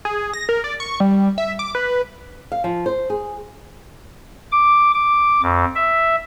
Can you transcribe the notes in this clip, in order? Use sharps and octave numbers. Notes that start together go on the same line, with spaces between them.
G#4
A#6
A#4
D5
C#6
G3
E5
D6
B4
F5
F3
C5
G#4
D6
D6
F2
E5